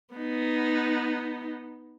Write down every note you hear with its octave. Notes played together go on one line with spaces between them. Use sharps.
B3 D#4